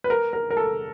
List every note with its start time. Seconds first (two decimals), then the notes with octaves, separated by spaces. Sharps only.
0.04 B4
0.10 A#4
0.33 A#4
0.51 A#4
0.57 A4